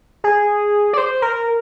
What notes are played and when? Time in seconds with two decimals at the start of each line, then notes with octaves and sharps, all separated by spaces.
0.24 G#4
0.93 D5
0.98 C5
1.22 A#4